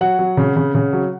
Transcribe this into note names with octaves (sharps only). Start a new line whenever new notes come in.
F#3 F#5
F#3
C#3
C#3
C#3
F#3